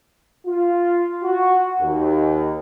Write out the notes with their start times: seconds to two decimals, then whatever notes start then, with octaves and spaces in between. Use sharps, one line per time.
0.46 F4
1.23 F#4
1.80 D#2